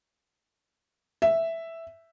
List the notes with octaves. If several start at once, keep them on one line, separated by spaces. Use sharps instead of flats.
E5